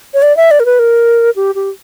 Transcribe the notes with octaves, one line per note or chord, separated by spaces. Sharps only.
C#5
D5
E5
D5
A#4
B4
A#4
G4
G4